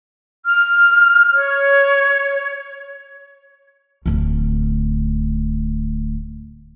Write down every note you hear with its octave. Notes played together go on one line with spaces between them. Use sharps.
F6
C#5
D1 D2